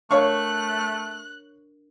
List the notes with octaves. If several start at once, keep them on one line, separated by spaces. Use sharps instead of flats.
A3 D4 A#4 C#5 F5 C#6 F#6